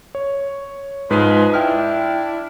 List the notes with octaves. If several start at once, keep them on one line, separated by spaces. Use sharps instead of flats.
C#5
G#2 F3 G#3 B4
D4 E4 G5 F6